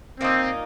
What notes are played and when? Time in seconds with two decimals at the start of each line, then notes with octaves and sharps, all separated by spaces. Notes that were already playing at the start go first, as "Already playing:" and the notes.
0.20 A#2 A#3 C4 D#4